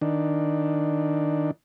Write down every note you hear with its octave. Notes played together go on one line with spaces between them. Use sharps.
D#3 D4